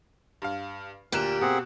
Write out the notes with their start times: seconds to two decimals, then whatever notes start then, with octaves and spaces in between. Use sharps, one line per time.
0.42 G2 F5
1.12 D2 A#2 A#3 G4 F#6 E7
1.41 B2 C4 G#4 F#5